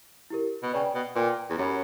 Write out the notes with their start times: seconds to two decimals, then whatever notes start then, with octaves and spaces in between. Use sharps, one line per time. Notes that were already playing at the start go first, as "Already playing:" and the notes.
0.30 E4 G4 A#4
0.63 B2
0.73 C#3 B4 D5 G5
0.95 B2
1.15 A#2 B4 D5 G5
1.50 E2
1.58 F#2 G4 C#5 F#5 B5